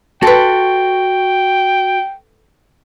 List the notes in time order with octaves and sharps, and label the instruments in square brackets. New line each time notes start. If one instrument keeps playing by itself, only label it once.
[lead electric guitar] F#4 C6 [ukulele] A4 B4 [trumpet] G5